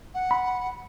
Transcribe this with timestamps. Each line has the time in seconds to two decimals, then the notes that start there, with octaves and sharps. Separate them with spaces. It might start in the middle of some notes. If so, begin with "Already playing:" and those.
0.14 F#5
0.31 B5